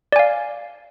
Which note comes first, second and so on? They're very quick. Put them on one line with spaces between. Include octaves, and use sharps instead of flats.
D5 G#5 F5